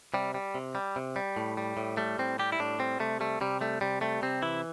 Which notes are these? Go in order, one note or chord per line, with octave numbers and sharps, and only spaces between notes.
C3 G3
G3
C3
G3
C3
G3
A2
G3
A2
G3 A3
A2 C4
G3 G4
E4
A2 D4
G3 C4
C3 A3
G3 A3
C3 G3
G3 A3
C3 G3
G3 A3
C3 C4
E3 E4